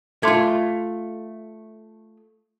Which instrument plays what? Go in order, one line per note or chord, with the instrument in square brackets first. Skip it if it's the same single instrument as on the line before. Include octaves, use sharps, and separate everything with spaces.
[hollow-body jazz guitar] A3 F4 [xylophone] C6 D6 G#6